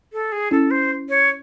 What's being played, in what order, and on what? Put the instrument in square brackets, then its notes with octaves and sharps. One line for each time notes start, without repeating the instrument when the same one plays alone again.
[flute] A4
G#4
[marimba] C#4 E4 [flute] A4
[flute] C5
C#5